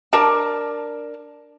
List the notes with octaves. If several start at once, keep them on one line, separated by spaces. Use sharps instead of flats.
D4 A#4 A5